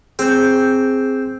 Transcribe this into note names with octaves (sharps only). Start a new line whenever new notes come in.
C4 G#4 G6